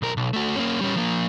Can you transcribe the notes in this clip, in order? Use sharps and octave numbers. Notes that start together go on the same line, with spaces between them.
B1 A#4
B1
A3 F#4
A#3 C#4
G3 C#4
F3 A#3